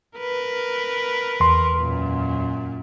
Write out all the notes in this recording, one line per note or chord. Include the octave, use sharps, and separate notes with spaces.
A#4 B4
E2 C6
F#2 A#2